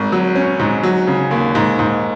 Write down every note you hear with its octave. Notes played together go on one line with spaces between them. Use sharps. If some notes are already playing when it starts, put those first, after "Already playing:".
Already playing: G#1
F#3
C#4
G#2
F#3
C#3
D#2
G#2
G#2